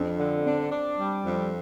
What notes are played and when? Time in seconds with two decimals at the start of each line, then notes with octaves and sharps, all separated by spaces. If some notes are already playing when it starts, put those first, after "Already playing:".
Already playing: F2 D4
0.19 D3
0.46 C4 D4
0.72 D4
0.99 G3
1.25 F2